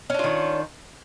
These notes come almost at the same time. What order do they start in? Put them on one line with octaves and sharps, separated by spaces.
C#4 D4 F4 D#3